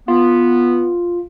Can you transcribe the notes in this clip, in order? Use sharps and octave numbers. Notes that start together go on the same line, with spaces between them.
B3 F4